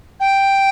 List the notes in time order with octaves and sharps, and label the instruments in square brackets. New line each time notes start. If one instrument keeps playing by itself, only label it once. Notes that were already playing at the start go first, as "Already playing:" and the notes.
[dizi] G5